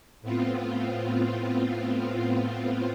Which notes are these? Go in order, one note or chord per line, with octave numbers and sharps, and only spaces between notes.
A2 B3 C4 F4